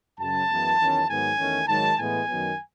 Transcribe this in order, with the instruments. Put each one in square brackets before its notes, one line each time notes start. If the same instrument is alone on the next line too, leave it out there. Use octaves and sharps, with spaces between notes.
[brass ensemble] F#2 C#3 F#3 A5
F#2 E3 G#3 B3
E2 D#3 F#3 C#4
G#2 D#3 F#3 B3 G#5
E2 D#3 A3 C#4
G#2 D#3 F#3 A5
A2 E3 G#3 B3 G#5
F#2 D#3 F#3 B3